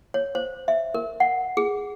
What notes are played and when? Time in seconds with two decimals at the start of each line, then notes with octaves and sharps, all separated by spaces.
0.14 C#5
0.35 C5
0.68 E5
0.94 A#4
1.20 F#5
1.57 G#4